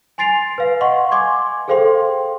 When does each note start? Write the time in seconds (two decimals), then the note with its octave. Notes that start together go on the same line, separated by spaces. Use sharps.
0.18 G#5 C6 A6 C7 D7 F7
0.58 B4 F5
0.81 D#5 F5 F#5 C6 C#6
1.11 G#5 C6 D6 G#6
1.68 G#4 A4 C5 F5 G5 C6